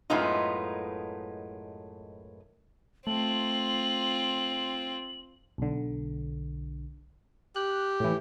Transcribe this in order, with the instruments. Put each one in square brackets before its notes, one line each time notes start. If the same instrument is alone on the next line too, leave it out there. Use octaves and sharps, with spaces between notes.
[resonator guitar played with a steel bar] F#2 A2 G#3 B3 D#4 F4
[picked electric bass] A3 [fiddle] C4 F4 [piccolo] F#7
[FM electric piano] B1 D3
[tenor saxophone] G4 [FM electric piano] F#6
[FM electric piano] A2 E3